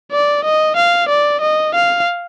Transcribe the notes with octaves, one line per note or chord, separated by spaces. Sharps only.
D5
D#5
F5
D5
D#5
F5